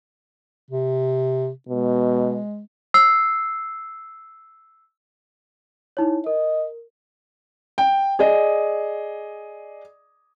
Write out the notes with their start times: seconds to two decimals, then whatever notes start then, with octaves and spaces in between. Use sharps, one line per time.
0.71 C3
1.68 B2 G#3
2.94 E6 C7
5.97 D#4 E4 C#5
6.26 A#4 D#5
7.78 G5
8.19 G#4 D5 D#5